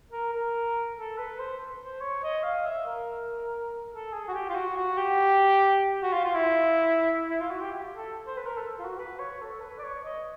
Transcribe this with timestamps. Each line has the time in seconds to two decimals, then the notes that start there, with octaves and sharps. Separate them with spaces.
0.11 A#4
0.33 A#4
0.97 A4
1.18 B4
1.39 C5
1.80 C5
2.01 C#5
2.24 D#5
2.43 F5
2.65 E5
2.86 A#4
3.92 A4
4.13 G#4
4.28 F#4
4.34 G4
4.49 F4
4.55 F#4
4.77 F#4
4.97 G4
6.02 F#4
6.13 F4
6.24 F4
6.34 E4
7.30 E4
7.40 F4
7.51 F#4
7.61 G4
7.94 A4
8.27 C5
8.37 B4
8.46 A#4
8.57 A4
8.79 F4
8.85 F#4
8.99 B4
9.19 C#5
9.41 A4
9.62 B4
9.79 D5
9.83 C#5
10.04 D#5